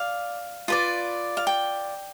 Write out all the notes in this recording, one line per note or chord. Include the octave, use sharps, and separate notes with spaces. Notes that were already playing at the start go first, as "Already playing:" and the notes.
Already playing: D5 F5
F4 B4 D5
F5
G5